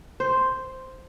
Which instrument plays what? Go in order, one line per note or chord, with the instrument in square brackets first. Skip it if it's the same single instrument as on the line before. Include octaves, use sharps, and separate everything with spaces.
[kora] C5